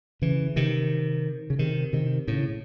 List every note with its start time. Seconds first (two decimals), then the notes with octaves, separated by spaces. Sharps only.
0.22 C#3 E3
0.56 C3 D#3
1.50 C#3
1.59 C3 D#3
1.93 C3 D#3
2.28 A2 C#3